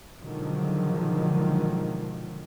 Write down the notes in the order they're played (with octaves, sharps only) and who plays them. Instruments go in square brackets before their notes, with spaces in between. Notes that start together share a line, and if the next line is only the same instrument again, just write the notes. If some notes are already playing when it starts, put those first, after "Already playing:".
[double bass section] B2 D3 D#3 F3 F#3 G#3